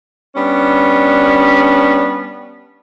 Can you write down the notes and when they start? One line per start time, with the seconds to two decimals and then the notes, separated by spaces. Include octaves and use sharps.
0.35 G3 B3 C#4 D4